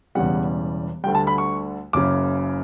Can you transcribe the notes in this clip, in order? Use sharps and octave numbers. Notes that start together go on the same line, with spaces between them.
E1 E2 C#3 E3 G3 F#5
D2 D3 G3 G5
A5
B5
C#6
F#1 F#2 C#3 D6